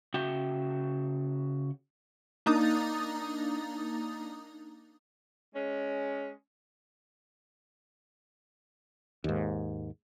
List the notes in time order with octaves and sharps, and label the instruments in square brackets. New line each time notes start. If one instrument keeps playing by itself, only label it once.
[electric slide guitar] C#3 F#4 E5 G5
[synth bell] A#3 D4 D#4 A#5 D#6 A6
[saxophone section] G#3 C#4
[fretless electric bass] D#2 G#2